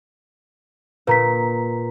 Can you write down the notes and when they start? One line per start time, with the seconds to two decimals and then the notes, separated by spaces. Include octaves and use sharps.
1.07 A#2 B4 A#5 B6